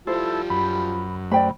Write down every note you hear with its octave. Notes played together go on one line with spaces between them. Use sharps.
F3 G3 E4 A4 C5
F#2 B5
A3 C5 D5 G5 B5